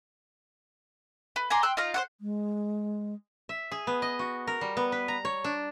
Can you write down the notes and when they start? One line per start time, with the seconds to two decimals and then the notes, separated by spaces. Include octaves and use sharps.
1.36 B4
1.50 G#5 A#5 C6 D6
1.63 G5 C6 E6 F#6
1.77 D#4 F4 F5 A#5
1.94 C5 C#5 F#5
2.21 G#3
3.49 E5
3.72 G#4
3.87 B3
4.02 D#5
4.19 F#4
4.47 A#4
4.61 G3
4.77 B3
4.92 B4
5.08 A#5
5.25 C#5
5.44 D4